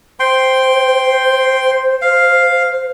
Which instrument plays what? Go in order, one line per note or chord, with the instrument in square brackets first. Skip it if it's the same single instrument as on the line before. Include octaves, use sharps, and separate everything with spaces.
[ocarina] C5 [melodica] G5 C6
[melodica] F5